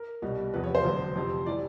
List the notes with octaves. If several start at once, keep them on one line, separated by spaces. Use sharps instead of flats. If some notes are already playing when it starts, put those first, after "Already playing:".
Already playing: A#4
C2 B2 G3
E2 C3 F3 B4
C#5
C5
E1 D2 D3 F#3
F2 C3 F3
A2 E3 G3 D5